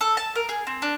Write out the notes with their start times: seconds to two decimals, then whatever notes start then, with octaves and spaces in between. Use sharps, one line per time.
0.01 A4
0.17 A5
0.36 A#4
0.49 G#4
0.67 C4
0.82 D4